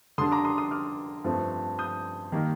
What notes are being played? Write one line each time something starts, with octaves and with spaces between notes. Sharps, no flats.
D3 G3 D4 C6 D#6
A#5 D6
C6 D#6
C6 D#6
D6 F6
G2 F3 A3 C4
D#6 G6
D#3 G3 A#3 D#4